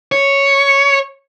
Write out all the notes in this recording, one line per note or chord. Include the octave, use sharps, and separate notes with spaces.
C#5